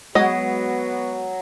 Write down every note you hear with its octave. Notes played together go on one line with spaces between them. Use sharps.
F#3 G#3 B3 F#4 D#5 F#5